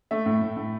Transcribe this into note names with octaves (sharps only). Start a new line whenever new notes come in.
A3 E5
A2
A2
A2